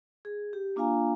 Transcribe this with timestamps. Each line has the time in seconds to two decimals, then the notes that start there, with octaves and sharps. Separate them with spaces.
0.25 G#4
0.53 G4
0.76 A#3 D4 F4 F5 G#5 A#5